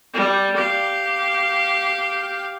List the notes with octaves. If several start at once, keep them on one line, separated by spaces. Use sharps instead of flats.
G3
G4 F5